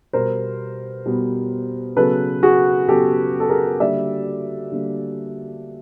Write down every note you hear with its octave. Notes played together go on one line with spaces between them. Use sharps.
B2 G3 B3 A#4 C5
B2 G3 B3
C#3 F#3 B3 A4 B4
F#4 G#4
C#3 F#3 B3 G4 A4
A4
G#4 A#4
D3 G3 A#3 D5 E5
D3 G3 A#3